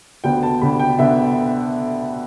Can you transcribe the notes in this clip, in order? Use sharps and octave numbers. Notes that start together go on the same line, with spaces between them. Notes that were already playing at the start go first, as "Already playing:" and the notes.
D2 D3 B3 G5
A5
D2 D3 B3 B5
G5
D3 B3 E5